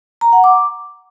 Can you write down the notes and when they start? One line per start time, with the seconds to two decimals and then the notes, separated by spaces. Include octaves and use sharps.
0.21 A#5
0.33 F#5
0.44 D6